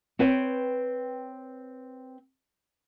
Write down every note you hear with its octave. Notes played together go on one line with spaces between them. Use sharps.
C4 B4 C#5 G5